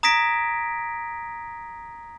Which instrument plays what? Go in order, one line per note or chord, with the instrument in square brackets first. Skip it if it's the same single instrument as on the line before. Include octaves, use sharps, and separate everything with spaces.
[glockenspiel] A#5 D#6 G#6 A#6 B6 D7